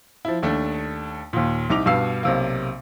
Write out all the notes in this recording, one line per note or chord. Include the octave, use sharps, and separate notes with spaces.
F3 E4
D#2 A3 D4
D#2 A#2
C2 D#4 D6 F7
G2 B2 B4 F5 E6 C7
B1 C3 A#3